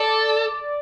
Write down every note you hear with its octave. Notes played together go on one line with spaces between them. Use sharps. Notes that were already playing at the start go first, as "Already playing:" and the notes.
Already playing: A4 D5